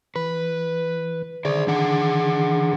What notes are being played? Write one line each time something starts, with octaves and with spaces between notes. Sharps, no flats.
E3 B4
D3 D#3 G#4 C5 D5
E3 D4 F#5